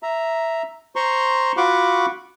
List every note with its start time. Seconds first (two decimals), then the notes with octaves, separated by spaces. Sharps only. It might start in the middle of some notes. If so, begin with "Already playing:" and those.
0.03 E5 A#5
0.96 C5 A#5 C6 C#6
1.57 F4 F#4 F#5 B5 C#6 D6